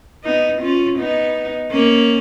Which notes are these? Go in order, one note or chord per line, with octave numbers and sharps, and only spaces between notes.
B3 D#4
C#4 F4
B3 D#4
A#3 C#4